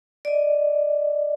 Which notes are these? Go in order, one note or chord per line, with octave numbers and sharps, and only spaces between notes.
D5 D#5